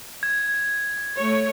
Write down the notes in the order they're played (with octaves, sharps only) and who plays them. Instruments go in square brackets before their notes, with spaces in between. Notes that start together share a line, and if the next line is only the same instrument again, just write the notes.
[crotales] G#6
[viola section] A3 C#5